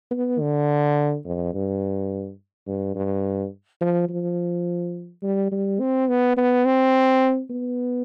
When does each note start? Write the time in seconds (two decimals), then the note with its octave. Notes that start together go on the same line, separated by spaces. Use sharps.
0.11 B3
0.40 D3
1.25 F2
1.54 G2
2.67 G2
2.95 G2
3.81 F3
4.09 F3
5.23 G3
5.52 G3
5.80 C4
6.08 B3
6.37 B3
6.65 C4
7.50 B3